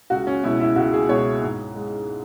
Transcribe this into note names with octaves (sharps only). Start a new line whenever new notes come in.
C#2 F#4
C#4
B2 G#3 E4
E4
C#2 F#4
G#4
B2 G#3 C#5
G#2
G#3